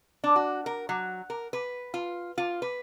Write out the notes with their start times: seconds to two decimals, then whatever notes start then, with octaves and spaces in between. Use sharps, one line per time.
0.24 D4
0.36 F#4
0.66 A#4
0.89 F#3
1.30 A#4
1.53 B4
1.94 F4
2.38 F4
2.62 B4